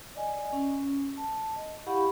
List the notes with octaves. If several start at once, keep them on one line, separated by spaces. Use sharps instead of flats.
D5 D#5 G#5
C#4
A5
D#5
E4 G4 F5 F#5 B5 C#6